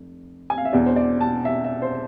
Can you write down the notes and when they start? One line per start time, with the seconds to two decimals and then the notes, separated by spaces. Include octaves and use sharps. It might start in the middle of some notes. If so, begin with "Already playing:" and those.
Already playing: F1
0.50 G#5
0.58 F5
0.65 E5
0.73 E1 E2 B2 D5
0.86 C5
0.96 D5
1.21 A5
1.45 E5
1.64 E5
1.82 C5